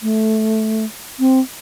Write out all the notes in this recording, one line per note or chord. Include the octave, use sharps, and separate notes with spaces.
A3
C4